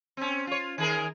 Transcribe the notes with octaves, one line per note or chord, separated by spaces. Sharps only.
C4 C#4
F4 C#5
D#3 G#4 A#4